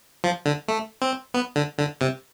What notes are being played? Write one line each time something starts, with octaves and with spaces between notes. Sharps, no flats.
F3
D3
A3
C4
B3
D3
D3
C3